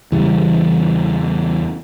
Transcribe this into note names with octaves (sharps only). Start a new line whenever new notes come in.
E2 C#3 E3 G3